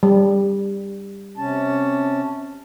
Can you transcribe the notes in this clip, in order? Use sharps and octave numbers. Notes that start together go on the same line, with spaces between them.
G3
C3 C#4 A5